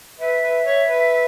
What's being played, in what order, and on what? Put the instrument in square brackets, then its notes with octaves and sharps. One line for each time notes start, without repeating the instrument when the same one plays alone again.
[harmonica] B4 [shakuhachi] E5
[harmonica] B4
C#5
B4